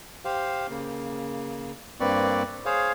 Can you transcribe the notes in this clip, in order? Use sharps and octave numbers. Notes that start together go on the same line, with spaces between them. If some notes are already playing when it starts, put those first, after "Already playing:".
G4 C5 F5
C#3 A#3
G2 A#3 C4 B4 D5 C#6
G#4 C5 C#5 F5